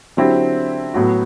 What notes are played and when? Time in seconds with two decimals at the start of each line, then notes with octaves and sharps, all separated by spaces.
0.17 D3 F#3 C4 E4 G4
0.94 A2 F#3 B3 F#4